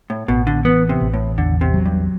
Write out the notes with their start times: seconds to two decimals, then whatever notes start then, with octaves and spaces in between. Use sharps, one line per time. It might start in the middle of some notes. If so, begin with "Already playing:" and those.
0.10 A2
0.28 A1 B2
0.47 D3
0.65 E3 B3
0.89 C3
1.01 A1
1.14 A2
1.38 E2 D3
1.61 C3
1.74 F#3
1.86 G2